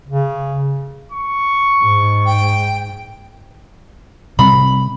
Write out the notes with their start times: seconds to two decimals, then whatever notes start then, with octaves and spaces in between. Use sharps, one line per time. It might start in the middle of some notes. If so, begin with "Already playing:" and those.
0.08 C#3
1.12 C#6
1.81 G#2
2.26 G5
4.39 C3 G3 C4 B5